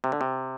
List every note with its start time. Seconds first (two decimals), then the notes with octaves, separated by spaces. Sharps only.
0.04 C3
0.12 D3
0.21 C3